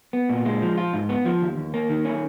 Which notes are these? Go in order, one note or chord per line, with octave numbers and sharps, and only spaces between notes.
B3
A#2
G#3
F3
F4
G#2
B3
F3
D#2
D#2
A#3
D#3
C#4